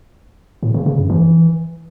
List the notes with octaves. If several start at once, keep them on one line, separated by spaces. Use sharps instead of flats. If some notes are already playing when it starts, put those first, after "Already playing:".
A2
C#3
C#3
F#2
E3